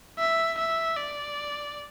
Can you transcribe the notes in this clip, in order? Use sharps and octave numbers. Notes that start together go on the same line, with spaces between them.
E5
E5
D5